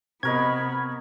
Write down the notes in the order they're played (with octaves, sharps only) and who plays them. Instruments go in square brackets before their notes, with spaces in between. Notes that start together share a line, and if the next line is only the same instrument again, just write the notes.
[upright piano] C3 [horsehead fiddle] B3 B5 [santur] F#4 A#4 D#5 [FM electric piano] G#6